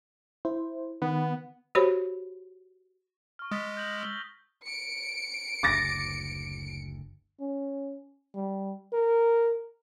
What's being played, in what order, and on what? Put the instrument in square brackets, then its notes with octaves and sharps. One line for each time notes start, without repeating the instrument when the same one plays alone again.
[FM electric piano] E4 C5
[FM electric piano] D#3 [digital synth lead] B3
[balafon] F#4 G4 C5 C#5 B5
[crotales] C#6 F6
[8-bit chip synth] G#3 [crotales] D#6 A6 B6
[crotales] G6 A#6 F#7
E6 G7
[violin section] C#7 D7
[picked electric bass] F#1 D2 [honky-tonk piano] D6 A6 A#6
[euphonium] C#4
G3
A#4